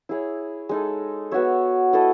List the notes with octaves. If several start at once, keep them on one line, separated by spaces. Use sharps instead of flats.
E4 G#4 C#5
G#3 D#4 A4
B3 F#4 C#5 E5
E4 A4 D#5